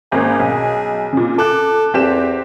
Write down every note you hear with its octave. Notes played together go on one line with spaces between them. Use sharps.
G#1 A#3 C#4 G#4
B1
A#2 C#3
A4 D6 F#6
E2 C4 G4 E7